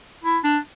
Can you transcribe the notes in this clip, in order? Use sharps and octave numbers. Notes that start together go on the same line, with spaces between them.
E4
D4